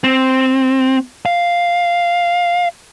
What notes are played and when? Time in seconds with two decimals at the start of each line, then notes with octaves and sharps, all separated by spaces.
0.04 C4
1.26 F5